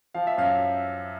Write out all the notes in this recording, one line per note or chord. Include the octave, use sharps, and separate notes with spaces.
F3 F5
E5
F#2 F5